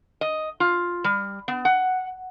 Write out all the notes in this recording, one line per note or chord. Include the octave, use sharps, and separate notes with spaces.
D#5
F4
G3
B3
F#5